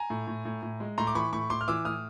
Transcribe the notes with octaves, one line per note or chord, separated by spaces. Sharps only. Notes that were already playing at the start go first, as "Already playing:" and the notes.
Already playing: G#5 A#5
A2
A2
A2
A2
G#3
A2 A#5 C6
D6
E3 B5 C#6
A2 B5 C#6
A2 C6 D6
F6
E3 D6 E6
A2 D#6 F6